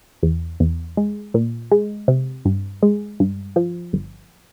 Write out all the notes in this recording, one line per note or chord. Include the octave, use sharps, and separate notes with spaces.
E2
E2
G#3
A#2
G#3
C3
G2
G#3
G2
F3
G1